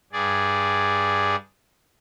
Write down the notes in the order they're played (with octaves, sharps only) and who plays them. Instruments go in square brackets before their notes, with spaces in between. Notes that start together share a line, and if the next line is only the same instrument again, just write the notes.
[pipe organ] G2 G#4 D5